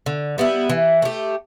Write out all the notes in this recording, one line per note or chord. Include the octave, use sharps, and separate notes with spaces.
D3
G3 B3 E4
E3
A3 G4